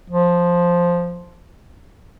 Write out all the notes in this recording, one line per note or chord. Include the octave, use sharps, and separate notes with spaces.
F3